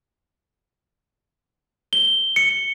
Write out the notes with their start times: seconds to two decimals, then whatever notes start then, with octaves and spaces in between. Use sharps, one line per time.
1.93 G7
2.36 C#7